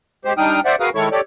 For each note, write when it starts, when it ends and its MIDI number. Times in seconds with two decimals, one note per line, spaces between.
0.25 0.33 56
0.25 0.33 67
0.25 0.33 72
0.38 0.60 55
0.38 0.60 62
0.38 0.60 63
0.38 0.60 79
0.38 0.60 87
0.38 0.60 89
0.65 0.76 72
0.65 0.76 74
0.65 0.76 76
0.65 0.76 78
0.80 0.90 66
0.80 0.90 68
0.80 0.90 70
0.80 0.90 71
0.80 0.90 77
0.80 0.90 87
0.95 1.09 51
0.95 1.09 56
0.95 1.09 64
0.95 1.09 69
0.95 1.09 73
0.95 1.09 85
1.12 1.21 67
1.12 1.21 69
1.12 1.21 73
1.12 1.21 74